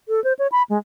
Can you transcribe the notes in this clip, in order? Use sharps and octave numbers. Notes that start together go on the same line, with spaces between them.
A4
C5
C#5
B5
G#3